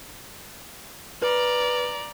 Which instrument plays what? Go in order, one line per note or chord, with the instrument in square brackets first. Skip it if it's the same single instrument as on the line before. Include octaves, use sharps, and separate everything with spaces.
[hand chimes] B4 [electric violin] D5 A#5